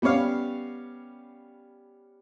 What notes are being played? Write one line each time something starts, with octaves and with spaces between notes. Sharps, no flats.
G3 B3 C#4 C#5 F5